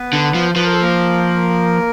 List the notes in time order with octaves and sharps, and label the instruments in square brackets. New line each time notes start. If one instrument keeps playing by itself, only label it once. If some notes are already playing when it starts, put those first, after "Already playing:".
Already playing: [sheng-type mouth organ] B3 B4
[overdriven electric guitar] D3
F3
[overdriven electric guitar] F3 [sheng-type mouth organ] B4
[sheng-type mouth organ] A#4
A4
A#3 A#4